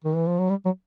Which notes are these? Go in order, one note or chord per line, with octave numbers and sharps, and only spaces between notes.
D#3
E3
F3
F#3
G3
F#3